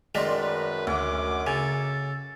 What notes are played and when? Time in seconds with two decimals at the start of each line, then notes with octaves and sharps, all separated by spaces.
0.15 F#2 D#3 G#3 A3 D5 C6
0.39 B4
0.87 D2 D6
1.47 C#3 A4 G#5